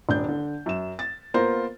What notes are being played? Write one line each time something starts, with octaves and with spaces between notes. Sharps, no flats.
D#1 D4 G6
D3
F#2 E7
A6
A#3 B3 F4 A#4 C5